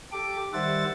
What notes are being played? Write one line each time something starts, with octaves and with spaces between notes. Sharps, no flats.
G4 A4 D6
D#3 G3 C5 E5 F#5 A6